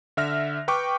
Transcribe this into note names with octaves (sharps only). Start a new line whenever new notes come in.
D3 E5 F6 A#6
B4 G5 C#6 D6